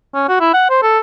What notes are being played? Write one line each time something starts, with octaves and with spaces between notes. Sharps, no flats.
C#4
F#4
E4
F#5
C5
A4